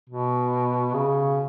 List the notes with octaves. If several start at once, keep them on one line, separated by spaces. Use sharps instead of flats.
B2
C#3